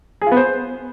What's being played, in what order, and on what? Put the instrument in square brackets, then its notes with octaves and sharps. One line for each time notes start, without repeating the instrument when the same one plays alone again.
[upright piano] G#4
F4
B3
C5